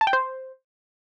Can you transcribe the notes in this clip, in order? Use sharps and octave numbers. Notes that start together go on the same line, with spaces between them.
A5
G5
C5